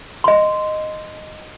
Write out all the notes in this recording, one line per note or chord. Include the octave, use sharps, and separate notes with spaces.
D#5 C6